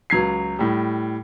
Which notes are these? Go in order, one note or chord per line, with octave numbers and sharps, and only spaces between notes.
C#2 F#3 G#6 C7
A2 G3